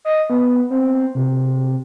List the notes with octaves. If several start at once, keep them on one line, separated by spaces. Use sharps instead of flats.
D#5
B3
C4
C3